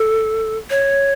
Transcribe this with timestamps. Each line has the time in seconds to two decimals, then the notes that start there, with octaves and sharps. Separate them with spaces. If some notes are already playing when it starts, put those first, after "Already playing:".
Already playing: A4
0.70 C#5